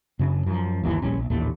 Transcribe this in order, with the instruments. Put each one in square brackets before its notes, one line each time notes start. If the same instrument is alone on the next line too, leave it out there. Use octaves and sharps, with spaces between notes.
[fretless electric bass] F#2 C#3 D4
F#2 F3
G1 D#2 E3
D1 A#1 G3 C#4
A#1
A1 D#2 A#2 A3